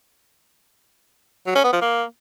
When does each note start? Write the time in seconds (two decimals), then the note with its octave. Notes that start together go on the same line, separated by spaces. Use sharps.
1.47 F#3
1.55 C#4
1.64 B3
1.73 F3
1.82 A#3